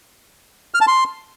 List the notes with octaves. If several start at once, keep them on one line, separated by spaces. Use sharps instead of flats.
F6
A5
C6